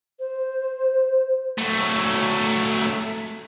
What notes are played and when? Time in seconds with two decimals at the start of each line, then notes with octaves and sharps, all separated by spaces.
0.20 C5
1.58 F#3 A3